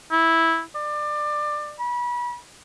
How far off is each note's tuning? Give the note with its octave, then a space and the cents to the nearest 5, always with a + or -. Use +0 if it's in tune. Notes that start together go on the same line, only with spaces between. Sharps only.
E4 -10
D5 +25
B5 -30